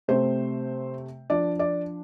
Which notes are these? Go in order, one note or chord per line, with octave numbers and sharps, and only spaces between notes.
C3 A3 C4 C5
F3 D4 D5
D5